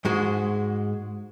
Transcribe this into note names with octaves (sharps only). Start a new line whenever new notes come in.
G#2 G#3 F#4